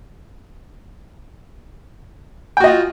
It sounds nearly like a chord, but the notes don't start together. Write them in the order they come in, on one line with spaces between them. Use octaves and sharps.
G5 F#4 D#5 F4